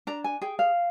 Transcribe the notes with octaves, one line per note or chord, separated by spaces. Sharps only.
D4 A#5
G#5
G#4 G5
F5